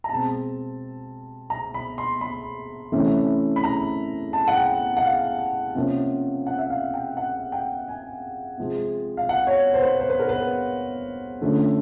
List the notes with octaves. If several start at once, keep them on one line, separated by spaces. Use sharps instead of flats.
A#5
B2 G#3 C4 A5
A#5
B5
C6
B5
C3 E3 A3 C#4
B5
A#5
A5
F#5
G5
F#5
F5
C3 F3 A#3 C#4
F#5
E5
F5
G5
F#5
G5
G#5
C3 F3 G#3
F5
F#5
C#5
C5
B4
C5
B4
A#4
B4
D3 F3 A3 C#4